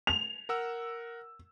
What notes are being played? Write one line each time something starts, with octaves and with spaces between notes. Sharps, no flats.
F7
A#4 F#5 E6